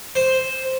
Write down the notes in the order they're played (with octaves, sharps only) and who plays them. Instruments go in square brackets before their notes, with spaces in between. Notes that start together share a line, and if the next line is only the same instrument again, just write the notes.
[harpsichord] C5